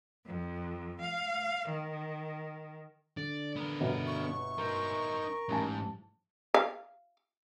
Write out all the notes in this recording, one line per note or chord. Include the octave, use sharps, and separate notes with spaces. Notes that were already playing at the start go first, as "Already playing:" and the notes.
F2
F5
D#3
D3 D5
B3 A#4
G1 B2 F#4
C#6
D#4 A#4 C5
A1 G#2 A5
F5